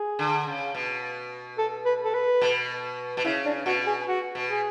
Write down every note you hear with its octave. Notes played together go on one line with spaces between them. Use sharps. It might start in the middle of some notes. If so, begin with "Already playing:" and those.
Already playing: G#4
D3
C#3
B2
A4
B4
A4
B4
B2
B2
C#3 E4
D4
B2 F#4
G#4
F#4
B2
G#4